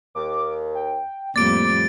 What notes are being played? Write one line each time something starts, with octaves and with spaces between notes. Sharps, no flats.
D#2 D6
G5
F2 A2 G3 A#3 D6 A6 D7